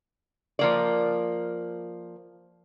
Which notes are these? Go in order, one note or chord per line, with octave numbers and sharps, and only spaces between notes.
F3 A#3 D5